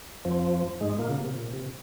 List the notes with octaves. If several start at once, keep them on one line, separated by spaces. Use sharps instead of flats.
F2 F3
G#2 G#3
A#2 A#3
C#3
C3
A#2
C3